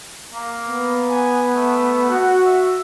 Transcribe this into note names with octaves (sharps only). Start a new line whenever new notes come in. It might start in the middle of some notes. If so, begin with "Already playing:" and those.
A#3
B3
G#5
A3
F#4 F#5
E5